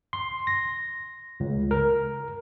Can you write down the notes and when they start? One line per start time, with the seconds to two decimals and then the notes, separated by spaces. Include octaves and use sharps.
0.13 C6
0.47 A#6
1.40 C#2
1.71 A#4